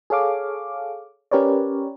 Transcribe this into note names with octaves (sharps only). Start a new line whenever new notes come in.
G#4 A4 C#5 F5 D6
C#4 G4 A#4 B4 C#5 D5